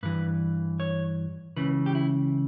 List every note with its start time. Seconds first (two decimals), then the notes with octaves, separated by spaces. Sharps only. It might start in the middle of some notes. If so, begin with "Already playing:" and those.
0.03 G2 E3 B4
0.80 C#5
1.57 C#2 C#3 E3 B4
1.86 G4
1.95 E4